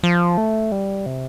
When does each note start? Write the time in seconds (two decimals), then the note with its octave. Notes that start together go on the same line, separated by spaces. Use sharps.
0.03 F3
0.38 A3
0.72 G3
1.06 C3